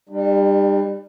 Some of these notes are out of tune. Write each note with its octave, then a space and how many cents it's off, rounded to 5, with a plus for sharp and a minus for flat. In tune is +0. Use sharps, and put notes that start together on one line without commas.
G3 +20 D#4 -45